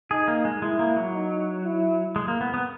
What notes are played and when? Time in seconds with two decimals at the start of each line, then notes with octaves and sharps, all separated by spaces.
0.11 D#4 G#4
0.28 A#3
0.45 G#3
0.62 G#3 E4
0.79 A#3
0.96 F#3
1.14 D#4
1.64 E4
2.16 G#3
2.28 A#3
2.41 B3
2.54 B3